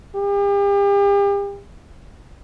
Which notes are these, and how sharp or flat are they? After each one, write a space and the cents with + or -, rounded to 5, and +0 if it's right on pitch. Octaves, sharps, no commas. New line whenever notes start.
G4 +40